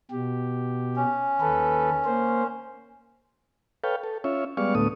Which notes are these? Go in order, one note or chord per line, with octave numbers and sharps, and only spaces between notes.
B2 G4
C#4
D#2 A4 B4
A#3 C5
A4 B4 C#5 F5 G5
A4
C#4 F4 C#5 E5
G3 G#3 B3 D5 F5 C#6
D2 A2 A3 B3 D#6